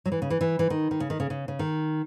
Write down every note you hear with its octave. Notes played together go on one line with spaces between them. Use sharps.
F#3
E3
C#3
E3
E3
E3
D#3
D#3
C#3
D#3
C#3
C#3
C#3
D#3